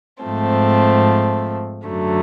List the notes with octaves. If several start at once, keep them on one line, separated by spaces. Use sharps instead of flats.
G#2 F3 A3 C4
F#2 D3 F#3 A3